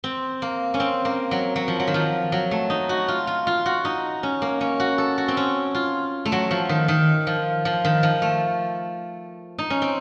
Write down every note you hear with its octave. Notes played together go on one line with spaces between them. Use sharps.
C4
A#3
C#4
C4
A#3
F#3
F#3
F3
F#3
D#3
F3
F#3
A3
D#4
F#4
F4
F4
F4
F#4
D#4
C#4
A#3
C#4
F#4
A4
F#4
C4
C#4
F4
A3
F#3
F3
D#3
D#3
F3
F3
D#3
F3
A3
D#4
C#4
C4